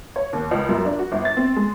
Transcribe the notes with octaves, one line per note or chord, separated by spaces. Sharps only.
C#5
D#2
C#2
F#2
D4
F#4
G1
A6
C4
G#3